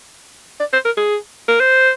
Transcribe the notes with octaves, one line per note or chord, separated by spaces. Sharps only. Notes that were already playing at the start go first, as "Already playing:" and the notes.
D5
C5
A#4
G#4
A#4
C5